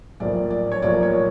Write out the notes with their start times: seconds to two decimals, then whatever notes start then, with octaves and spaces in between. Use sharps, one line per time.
0.20 B1 A2 F3 A#3 D5
0.51 D5
0.72 C#5
0.82 B1 A2 F3 A#3 D5
1.03 C#5